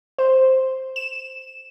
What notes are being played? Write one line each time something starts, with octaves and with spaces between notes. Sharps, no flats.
C5
E7